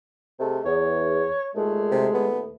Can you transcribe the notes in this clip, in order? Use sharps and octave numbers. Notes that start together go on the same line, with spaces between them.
C3 G#3 A3
E2 C#5
D#2 A#2 G#3 A3
C3
B3